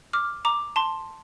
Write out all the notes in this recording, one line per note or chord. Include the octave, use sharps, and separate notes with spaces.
D6 F6
A#5 D6
A5 C6